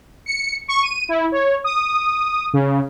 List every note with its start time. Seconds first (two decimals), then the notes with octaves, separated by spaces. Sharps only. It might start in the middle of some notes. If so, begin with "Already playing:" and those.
0.26 C#7
0.68 C#6
0.83 D#7
1.09 E4
1.32 C#5
1.64 D#6
2.53 C#3